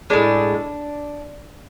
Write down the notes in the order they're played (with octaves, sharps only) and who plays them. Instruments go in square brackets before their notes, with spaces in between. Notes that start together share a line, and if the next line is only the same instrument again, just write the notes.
[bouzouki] A2 G#3 D4